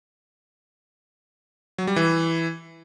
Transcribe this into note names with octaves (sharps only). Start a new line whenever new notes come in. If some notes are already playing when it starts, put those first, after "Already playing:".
F#3
G3
E3